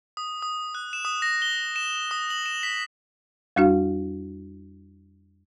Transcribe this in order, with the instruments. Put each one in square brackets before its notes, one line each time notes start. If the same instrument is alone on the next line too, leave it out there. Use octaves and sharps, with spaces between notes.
[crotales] D#6
D#6
F#6
E7
D#6
A#6
G7
E7
D#6
F#7
E7
B6
[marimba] F2 G3 D4 F#4 F5